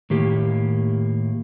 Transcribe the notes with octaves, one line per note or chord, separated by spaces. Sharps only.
A2 D#3 A#3 G4